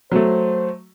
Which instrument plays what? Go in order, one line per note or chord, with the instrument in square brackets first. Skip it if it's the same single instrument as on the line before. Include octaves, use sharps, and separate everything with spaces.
[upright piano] F#3 A3 [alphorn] C5